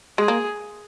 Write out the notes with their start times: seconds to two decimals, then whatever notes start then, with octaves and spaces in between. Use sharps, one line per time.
0.18 G#3 G#4
0.28 A#3